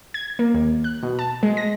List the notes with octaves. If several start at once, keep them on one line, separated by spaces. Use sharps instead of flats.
G#6
A#3
D#2
F#6
B2
A5
G#3
A#6